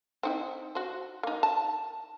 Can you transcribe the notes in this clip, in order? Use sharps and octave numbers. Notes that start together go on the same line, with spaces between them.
C4 D#4 E4
F#4 C5
A#3 D#4
A5